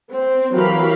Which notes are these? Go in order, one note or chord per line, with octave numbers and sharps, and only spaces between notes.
C4
E3 F#3 G4 A#4 F5 B5